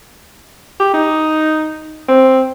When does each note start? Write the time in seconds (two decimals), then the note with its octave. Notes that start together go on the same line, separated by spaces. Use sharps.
0.80 G4
0.94 D#4
2.08 C4